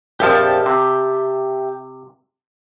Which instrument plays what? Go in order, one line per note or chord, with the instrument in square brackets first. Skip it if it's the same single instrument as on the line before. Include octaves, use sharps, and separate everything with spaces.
[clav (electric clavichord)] A#1 F2 F3 [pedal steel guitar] G4 E5 A5
[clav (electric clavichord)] C3